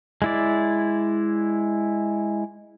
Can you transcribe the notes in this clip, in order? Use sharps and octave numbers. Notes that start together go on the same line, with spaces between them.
G#3 E4 D5